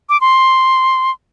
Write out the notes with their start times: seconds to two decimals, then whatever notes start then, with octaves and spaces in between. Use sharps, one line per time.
0.09 D6
0.21 C6